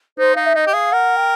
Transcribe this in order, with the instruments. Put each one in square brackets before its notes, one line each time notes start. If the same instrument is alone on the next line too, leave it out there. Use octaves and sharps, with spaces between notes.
[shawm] D#4 [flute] C5
[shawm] D#4 [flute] F5
[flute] E5
[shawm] D#4 [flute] D#5
[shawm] G4
[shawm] G#4 [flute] F5
[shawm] A#4 [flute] F#5
[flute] G5